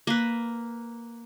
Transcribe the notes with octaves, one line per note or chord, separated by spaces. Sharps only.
A#3 B4